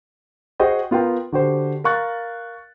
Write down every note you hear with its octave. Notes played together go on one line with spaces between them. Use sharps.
F#4 G#4 C5 D#5 F#5 G5
B3 F4 A#4 G5
D3 F#4 G4 C5
A#4 F5 C#6 F#6 A6